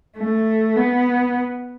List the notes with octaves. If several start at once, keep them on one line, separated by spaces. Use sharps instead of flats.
A3
B3